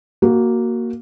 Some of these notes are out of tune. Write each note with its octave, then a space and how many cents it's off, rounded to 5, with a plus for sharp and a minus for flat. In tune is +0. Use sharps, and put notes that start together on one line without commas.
A#3 +0 F#4 +10